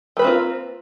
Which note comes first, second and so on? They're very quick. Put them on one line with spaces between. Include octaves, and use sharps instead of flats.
A3 B4 A#3 C4 F4